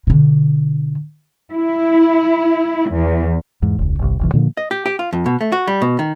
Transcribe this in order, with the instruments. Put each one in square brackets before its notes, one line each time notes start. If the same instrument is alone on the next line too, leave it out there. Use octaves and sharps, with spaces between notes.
[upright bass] B2 D3
[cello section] E4
E2
[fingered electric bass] E2 G#2
E1 C#2
G1 C2
F1 B1 E3
A#2 D3 F3 A#3
[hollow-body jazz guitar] D#5
G4
G4
F4
F2
B2
A3
F#4
G3
B2
D#3